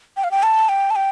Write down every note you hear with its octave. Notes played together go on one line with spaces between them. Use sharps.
G5
F5
G5
A5
G5
A5
G5